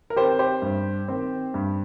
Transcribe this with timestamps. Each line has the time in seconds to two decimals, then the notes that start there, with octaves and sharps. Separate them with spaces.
0.10 A#4
0.16 D#3 C4 G4 C5
0.39 G4 C5
0.62 G2
1.08 D#3 C4
1.54 G2